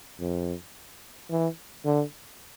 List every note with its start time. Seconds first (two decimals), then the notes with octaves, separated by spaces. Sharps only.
0.20 F2
1.31 E3
1.86 D3